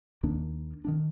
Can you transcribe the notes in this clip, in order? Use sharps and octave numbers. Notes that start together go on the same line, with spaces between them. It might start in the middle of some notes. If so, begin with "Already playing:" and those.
D#2 D#3 A#3 D4
D#3 A#3 D4